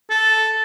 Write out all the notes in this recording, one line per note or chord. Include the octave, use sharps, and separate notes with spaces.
A4